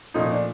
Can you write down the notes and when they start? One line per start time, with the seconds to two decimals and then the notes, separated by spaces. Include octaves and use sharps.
0.14 A#2 F3 A3 D#4
0.31 D4